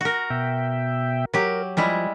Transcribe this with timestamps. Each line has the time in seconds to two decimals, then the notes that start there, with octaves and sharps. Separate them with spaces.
0.01 F#4 A#4
0.30 B2 E5 G5
1.34 F#3 G4 A#4
1.77 F3 G3 G#3 E4